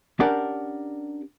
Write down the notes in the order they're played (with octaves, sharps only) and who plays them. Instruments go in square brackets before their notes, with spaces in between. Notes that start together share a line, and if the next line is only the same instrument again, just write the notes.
[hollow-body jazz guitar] C#4 D4 G4 A#4 D5 F#5